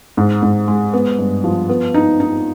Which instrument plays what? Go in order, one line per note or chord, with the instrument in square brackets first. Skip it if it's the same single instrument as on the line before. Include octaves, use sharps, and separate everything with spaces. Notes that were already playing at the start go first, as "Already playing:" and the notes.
[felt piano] G#2
G#2
G#3
B3
G2
F3
B3
D#4
D#4